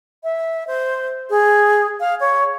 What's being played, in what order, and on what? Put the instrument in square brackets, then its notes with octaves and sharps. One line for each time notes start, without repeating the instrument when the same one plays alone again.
[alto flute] E5
C5
G#4
F5
C#5